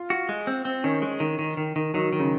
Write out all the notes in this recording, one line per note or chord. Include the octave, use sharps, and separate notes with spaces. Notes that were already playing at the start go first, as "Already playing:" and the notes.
Already playing: F4
F#4
G#3
C4
C4
D#3 C#4
G#3
D#3
D#3
D#3
D#3
D#3 F#3
D#3
C#3